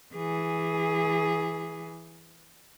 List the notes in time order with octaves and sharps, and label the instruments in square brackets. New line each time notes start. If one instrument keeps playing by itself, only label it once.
[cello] E3 G#4